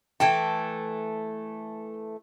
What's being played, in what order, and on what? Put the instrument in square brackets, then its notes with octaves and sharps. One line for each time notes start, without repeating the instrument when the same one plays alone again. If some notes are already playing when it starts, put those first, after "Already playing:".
[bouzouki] E3 A3 A5 [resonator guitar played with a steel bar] G5